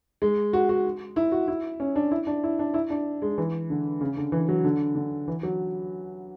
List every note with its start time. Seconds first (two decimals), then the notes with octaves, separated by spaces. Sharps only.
0.22 G#3
0.53 F#4
0.69 F#4
1.16 E4
1.32 F#4
1.48 E4
1.80 C#4
1.96 D4
2.11 E4
2.27 D4
2.44 E4
2.59 D4
2.74 E4
2.90 D4
3.22 G#3
3.38 E3
3.70 D3
4.01 C#3
4.17 D3
4.32 E3
4.49 F#3
4.64 D3
4.95 D3
5.28 E3
5.43 F#3